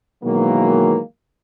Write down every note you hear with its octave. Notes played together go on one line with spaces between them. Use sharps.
B2 D#3 E3 F#3 G#3 A#3